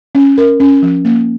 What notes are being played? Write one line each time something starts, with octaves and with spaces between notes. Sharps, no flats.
C#4
A#4
C#4
F3
A#3